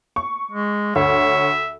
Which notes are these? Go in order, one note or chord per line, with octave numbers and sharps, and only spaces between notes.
C#6
G#3
D2 C#5 E5